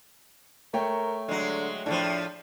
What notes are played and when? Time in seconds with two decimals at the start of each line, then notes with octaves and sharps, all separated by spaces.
0.74 A3 A#4 C#5 G5
1.28 D3 F#3 G#3
1.86 A2 C#3 F3 D4